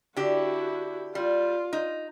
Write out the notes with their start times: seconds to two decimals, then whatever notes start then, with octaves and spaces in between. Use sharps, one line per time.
0.16 D3 E4 F#4 G4
1.15 G3 F4
1.73 D#4